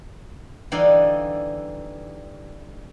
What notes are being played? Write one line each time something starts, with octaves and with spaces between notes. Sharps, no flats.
D3 E3 G3 D#4 D5 F5